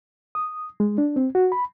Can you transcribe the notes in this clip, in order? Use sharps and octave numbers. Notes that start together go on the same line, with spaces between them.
D#6
G#3
D4
C4
F#4
B5